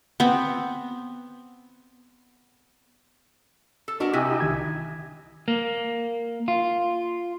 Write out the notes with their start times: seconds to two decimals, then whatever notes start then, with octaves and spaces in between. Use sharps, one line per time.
0.20 B3 C4
3.88 A4
4.00 B3 D4 F#4 A#4 D#5 A5
4.13 C3 E4 G4 D#5 G#5 E6 B6
4.40 C2 D#3 G#6
5.48 A#3
6.48 F4